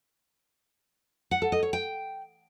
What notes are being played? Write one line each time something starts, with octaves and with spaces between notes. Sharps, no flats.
F#5
A4
D#5
C#5
G5